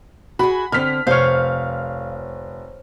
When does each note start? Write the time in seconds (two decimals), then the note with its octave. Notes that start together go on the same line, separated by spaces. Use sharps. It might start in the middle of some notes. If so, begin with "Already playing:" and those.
0.39 F#4 G#4 B5
0.72 D3 C4 F6 B6
1.07 F1 C5 C#5 F5 F6